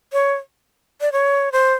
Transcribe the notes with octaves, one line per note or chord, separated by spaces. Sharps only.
C#5
D5
C#5
C5